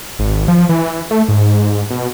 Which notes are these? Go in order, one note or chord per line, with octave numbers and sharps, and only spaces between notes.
G#1
F3
E3
A3
G#2
B2